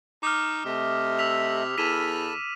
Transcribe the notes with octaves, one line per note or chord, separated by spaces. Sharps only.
D#4 D6 D#6 F6
C3 A3 D#5 E5
E6 B6 F7
E2 A4 B5 F6 B6 D#7 E7